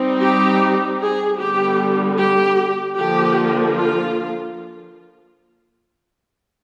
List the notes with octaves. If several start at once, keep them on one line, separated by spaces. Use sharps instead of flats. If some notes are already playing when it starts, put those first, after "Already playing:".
Already playing: G3 C4 D#4
G4
G#4
D3 G3 B3 G4
G4
D3 F3 A#3 G4
F4